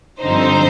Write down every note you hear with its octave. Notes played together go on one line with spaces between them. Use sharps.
G2 D3 F3 C4 D#4 C5